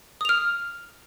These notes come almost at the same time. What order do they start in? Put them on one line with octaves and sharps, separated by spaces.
D#6 F7 F6